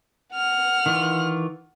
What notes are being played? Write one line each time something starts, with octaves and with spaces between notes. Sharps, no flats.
F#5 F6
D#3 E3 F4